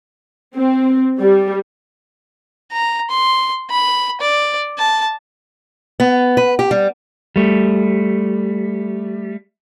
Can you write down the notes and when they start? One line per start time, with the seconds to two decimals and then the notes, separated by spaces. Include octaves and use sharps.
0.54 C4
1.19 G3
2.72 A#5
3.10 C6
3.71 B5
4.21 D5
4.78 A5
6.00 B3
6.37 B4
6.59 G4
6.71 G3
7.36 G3 A3